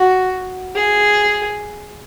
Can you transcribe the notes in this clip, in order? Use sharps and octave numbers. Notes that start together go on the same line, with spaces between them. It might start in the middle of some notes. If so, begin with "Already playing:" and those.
Already playing: F#4
G#4